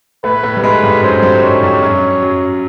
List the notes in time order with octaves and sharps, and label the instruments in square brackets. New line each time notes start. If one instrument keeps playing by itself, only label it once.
[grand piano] A2 A3 [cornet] B4
[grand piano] A2 A3
G3
[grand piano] G#2 G#3 [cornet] B4
[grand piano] G2 G3
[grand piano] F#2 F#3 [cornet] C5
[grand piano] G2 G3
[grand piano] G#2 G#3 [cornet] C#5
[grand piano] G2 G3
F#2 F#3
F#2 F#3